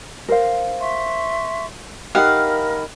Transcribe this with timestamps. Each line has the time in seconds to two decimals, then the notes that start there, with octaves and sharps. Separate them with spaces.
0.29 A#4 C5 F5
0.80 E5 C6 C#6
2.15 D#4 G4 A#4 F5 F#5 B5